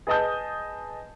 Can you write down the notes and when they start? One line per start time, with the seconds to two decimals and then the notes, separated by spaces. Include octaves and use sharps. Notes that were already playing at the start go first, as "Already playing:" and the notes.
0.07 G#4 B4 D#5 A5 D#6 G6